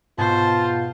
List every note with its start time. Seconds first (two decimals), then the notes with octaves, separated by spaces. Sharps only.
0.18 G#2 B2 B3 F4 C5 A5